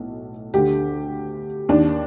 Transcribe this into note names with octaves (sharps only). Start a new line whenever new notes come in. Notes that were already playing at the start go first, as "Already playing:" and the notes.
Already playing: B1 A2
D2 D3 G4
D#2 D#3 D4